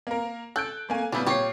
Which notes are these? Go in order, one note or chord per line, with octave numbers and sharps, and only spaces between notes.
A#3 A#4
A4 F#6 G6 D7
A3 A#3 G#5
A#2 G3 B3 D4 E4
A#2 G4 C#5 C7